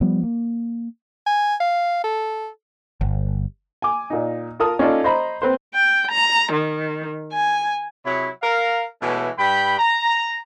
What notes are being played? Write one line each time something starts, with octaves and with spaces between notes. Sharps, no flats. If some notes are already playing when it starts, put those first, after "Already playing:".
F3 G3 B3
A#3
G#5
F5
A4
G1
G#5 D6
A#2 D#4
F4 A#4 A5 D#6 F6
C#4 D#4 F4 A4 D5
C5 D#5 A#5 B5
C4 B4 C5
G5
A#5
D#3
G#5
C3 F#3 E4 G#4 C#5 B5
A#4 F5
B2 E3 G#3 A3 C#4
G2 G5 B5
A#5